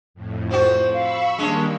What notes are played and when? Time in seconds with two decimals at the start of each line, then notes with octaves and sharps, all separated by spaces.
0.14 F2 A2
0.51 F3 F4 F#4 C5
0.93 F5 B5 C#6 E6
1.39 D#3 G3 G#3 A#3 C#4 D4